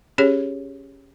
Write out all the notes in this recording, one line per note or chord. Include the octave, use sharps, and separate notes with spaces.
C#4 G4 G#4 C#5